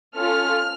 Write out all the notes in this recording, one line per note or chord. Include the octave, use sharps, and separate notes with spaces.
C#4 F4 A4 F6